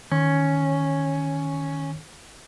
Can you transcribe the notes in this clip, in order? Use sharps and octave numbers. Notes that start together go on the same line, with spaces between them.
D#3 C#4